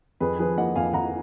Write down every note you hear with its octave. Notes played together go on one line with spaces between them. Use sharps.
F2 G#4 B4
F3 G#4 B4
A#3 D#5 F#5
F2 F5 G#5
F2 F#5 A#5